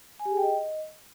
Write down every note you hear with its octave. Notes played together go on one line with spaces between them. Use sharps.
G#5
G4
G#4
G5
D#5